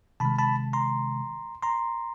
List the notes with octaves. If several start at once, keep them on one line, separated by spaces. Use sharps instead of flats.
C3 D#3 G#3 A5 B5
A5 B5
A#5 C6
A#5 C6